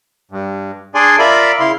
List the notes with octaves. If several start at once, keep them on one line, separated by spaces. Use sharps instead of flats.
G2
D4 G#4 D5 G#5 C6
F4 A#4 D5 E5 B5
C#3 E4 F5 C6